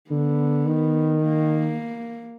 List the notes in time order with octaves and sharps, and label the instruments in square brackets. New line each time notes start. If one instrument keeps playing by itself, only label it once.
[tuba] D3 [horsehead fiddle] B3
[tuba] D#3
[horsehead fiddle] A#3